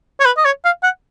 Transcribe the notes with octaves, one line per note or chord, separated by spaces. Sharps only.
C#5
B4
D#5
C#5
F5
F#5